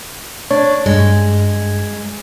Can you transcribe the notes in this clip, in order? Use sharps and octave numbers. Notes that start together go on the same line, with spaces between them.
D4 C#5
G2 G#3